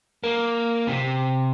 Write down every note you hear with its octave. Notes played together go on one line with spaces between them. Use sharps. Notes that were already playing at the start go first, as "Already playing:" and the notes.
A#3
C3